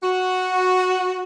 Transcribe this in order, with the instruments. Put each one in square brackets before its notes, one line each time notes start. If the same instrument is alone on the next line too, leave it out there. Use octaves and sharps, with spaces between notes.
[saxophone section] F#4